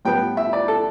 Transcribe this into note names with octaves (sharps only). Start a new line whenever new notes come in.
A2 G3 B3 G5
E5
D5
A4